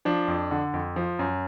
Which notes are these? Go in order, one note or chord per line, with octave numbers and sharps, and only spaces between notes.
F3 D4
F2
D3
F2
F3
F#2